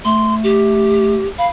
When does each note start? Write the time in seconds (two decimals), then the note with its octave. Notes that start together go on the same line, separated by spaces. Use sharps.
0.05 A3 C6
0.44 G4
1.38 F5 B5